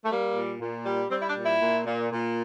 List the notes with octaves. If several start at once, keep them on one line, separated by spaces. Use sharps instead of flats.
A3
G3 A#3
A#2
A#2
G3
G3 C4
E4
D4
A#2
E4
A#2
A#2
A#2